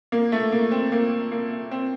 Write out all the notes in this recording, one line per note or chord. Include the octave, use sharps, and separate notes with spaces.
A#3
A3
A#3
C4
A#3
A#3
C4